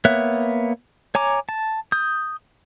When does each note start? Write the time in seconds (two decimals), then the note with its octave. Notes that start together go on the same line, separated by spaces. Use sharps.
0.05 A#3 B3 C#5 E5 F#6
1.15 C#5 G#5 A#5 D6
1.49 A5
1.92 D#6 G6